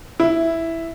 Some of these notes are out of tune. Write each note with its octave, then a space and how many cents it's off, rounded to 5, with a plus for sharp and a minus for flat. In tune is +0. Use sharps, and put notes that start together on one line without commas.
E4 +0